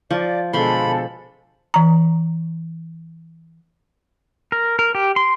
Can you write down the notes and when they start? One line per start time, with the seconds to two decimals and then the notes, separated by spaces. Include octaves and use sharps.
0.10 F3 D5
0.53 B2 D3 F3 G#3 A4 B5 C6
1.74 E3 A#5
4.52 A#4
4.79 A#4
4.95 G4
5.16 C6